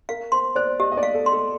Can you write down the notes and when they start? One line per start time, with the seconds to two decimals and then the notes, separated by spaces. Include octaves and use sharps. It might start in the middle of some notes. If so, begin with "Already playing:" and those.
0.09 A#4 F5
0.32 C5 C6
0.56 C5 D5
0.80 G4 D#5
0.92 D#5
0.97 D5
1.03 F5
1.14 A4
1.26 C6
1.32 A4